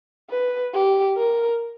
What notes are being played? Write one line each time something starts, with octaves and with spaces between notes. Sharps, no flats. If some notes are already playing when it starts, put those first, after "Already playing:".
B4
G4
A#4